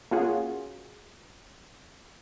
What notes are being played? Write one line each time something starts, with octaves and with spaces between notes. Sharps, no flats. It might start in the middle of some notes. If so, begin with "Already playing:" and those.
A#3 C#4 F4 F#4 G#4